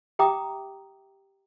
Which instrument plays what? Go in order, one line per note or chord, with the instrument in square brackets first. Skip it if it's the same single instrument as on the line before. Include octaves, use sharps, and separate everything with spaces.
[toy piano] G4 E5 G5 A#5 D6 D#6